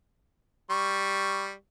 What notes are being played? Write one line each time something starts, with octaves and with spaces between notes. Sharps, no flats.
G3 C#6